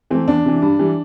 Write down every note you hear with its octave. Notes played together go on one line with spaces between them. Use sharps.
E3 A3 C4
E2 D4
C3 E3
G2
E3 G3